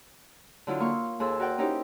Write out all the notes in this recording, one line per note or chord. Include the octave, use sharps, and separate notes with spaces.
D3 F#3 E4 F4
A#3 F5 C6 C#6
D#2 G#4 A4 C6 E6
F#4 A#4 D5 F#5 G5
C#4 D#4 E4 G4 C5